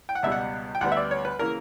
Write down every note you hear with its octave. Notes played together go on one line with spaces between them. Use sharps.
G5
F#5
C#2 B2 G3 E5
F#5
G5
D2 D3 G3 B3 F#5
E5
D5
C#5
B4
C#3 E3 A#3 C#4 A#4